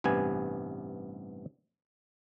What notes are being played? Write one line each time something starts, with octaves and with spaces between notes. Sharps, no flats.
A1 G2 C3 B3 G#5